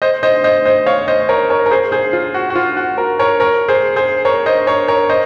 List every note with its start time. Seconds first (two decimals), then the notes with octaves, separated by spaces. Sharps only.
0.02 C5 D#5
0.23 C5 D#5
0.44 C5 D#5
0.65 C5 D#5
0.86 C#5 F5
1.08 C5 D#5
1.29 A#4 C#5
1.50 A#4 C#5
1.66 A#4
1.71 G#4 C5
1.92 G#4 C5
2.13 F4
2.34 F#4
2.50 F#4
2.56 F4
2.77 F#4
2.98 F#4 A#4
3.19 A#4 C#5
3.40 A#4 C#5
3.68 G#4 C5
3.96 G#4 C5
4.25 A#4 C#5
4.46 C5 D#5
4.67 A#4 C#5
4.88 A#4 C#5
5.09 C5 D#5